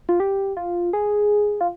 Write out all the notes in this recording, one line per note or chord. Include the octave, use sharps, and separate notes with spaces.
F4
G4
F4
G#4
F4